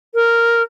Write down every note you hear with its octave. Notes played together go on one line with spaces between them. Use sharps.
A#4